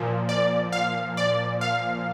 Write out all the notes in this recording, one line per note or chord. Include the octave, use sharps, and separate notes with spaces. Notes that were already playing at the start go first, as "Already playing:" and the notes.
Already playing: A#2 F3
D5
F5
D5
F5